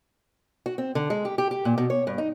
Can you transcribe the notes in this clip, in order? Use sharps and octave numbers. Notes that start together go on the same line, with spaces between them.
F#4
C4
D3
G#3
G4
G4
G4
A#2
B2
C#5
G2
D#4